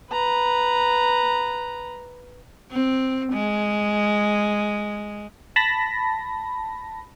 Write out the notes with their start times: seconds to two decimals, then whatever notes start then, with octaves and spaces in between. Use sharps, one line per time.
0.11 B4 A#5
2.72 C4
3.33 G#3
5.56 A5 B5 A#6